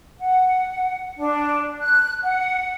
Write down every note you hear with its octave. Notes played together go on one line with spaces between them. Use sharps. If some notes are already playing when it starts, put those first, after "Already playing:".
F#5
D4
F#6
F#5